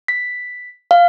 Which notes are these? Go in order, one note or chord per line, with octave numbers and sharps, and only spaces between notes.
B6
F5